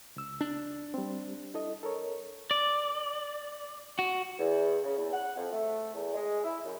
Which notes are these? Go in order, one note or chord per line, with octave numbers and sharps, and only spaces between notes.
C#2 E6
D4
G3 C4
E4 A4 D#5
A4 A#4 C#5
D5
F#4
E2
C#3
E2
F#5
F2
A3
E2
G#3
E4
F#2